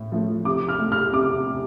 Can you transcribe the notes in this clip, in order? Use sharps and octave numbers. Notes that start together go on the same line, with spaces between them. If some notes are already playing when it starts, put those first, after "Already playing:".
Already playing: A2
F3 A3
C3 D6
F6
A3
F6
C3 D6